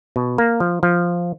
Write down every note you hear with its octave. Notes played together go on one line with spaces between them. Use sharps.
B2
A#3
F3
F3